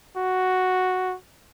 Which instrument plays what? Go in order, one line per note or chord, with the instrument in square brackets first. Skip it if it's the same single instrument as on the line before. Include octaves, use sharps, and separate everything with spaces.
[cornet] F#4